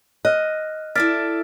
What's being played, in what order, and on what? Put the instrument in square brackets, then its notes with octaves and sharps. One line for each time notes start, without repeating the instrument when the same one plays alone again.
[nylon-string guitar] D#5 [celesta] F6 F#6
[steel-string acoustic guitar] E4 A4 D5 [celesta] F6 A6 B6